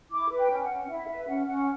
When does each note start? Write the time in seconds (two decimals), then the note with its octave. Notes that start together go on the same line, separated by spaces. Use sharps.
0.10 E4 D6
0.30 B4
0.37 G5
0.50 C#4
0.63 F#5
0.69 C#4
0.88 E4 E5
1.07 B4 E5
1.27 C#4 F#5
1.47 C#4 F#5